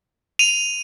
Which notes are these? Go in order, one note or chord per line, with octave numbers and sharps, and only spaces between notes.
D#7 F7